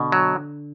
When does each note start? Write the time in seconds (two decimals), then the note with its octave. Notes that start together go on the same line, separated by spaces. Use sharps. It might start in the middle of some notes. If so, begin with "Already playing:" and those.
Already playing: B2 D3
0.12 F#3